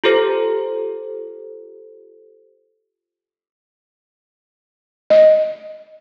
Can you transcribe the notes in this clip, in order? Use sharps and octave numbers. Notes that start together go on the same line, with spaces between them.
F4 G4 A4 C5
D#5